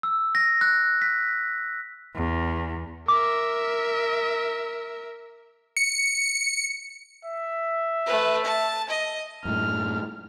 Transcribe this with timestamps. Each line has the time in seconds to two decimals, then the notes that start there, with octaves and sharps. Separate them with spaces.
0.03 E6
0.35 A#6
0.61 F#6
1.02 B6
2.15 E2
3.08 A#4 E5 D6
5.77 C#7
7.25 E5
8.06 A3 B4
8.44 A5
8.89 D#5
9.45 F#2 A2 F6